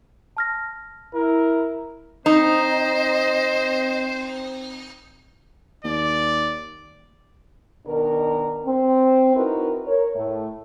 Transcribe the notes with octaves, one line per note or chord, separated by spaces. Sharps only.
A5 F6 A#6
E4 A#4
C4 D#4 C5 D#5
D#2 D5
B2 D#3 D4 A#4
C4
C4 D#4 E4 F#4 A#4 B4
A#4 C#5
A2 A3